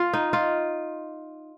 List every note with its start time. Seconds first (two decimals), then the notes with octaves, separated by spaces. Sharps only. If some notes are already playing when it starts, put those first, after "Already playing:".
Already playing: F4
0.13 D#4
0.33 F4